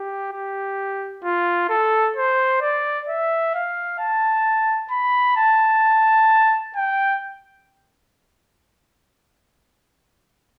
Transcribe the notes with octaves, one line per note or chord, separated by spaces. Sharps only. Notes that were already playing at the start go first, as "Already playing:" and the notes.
Already playing: G4
G4
F4
A4
C5
D5
E5
F5
A5
B5
A5
G5